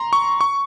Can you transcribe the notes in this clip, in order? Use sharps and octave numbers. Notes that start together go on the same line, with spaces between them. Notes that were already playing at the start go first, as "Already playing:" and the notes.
Already playing: A#5 C6
C#6
C#6